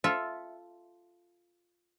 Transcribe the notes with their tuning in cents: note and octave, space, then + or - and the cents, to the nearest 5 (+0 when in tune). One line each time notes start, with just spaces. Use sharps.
F4 +0 A4 -10 E5 +0